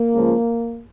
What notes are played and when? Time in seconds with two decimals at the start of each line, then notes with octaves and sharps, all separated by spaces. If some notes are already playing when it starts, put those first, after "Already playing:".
Already playing: A#3
0.12 C#2 C#3 F3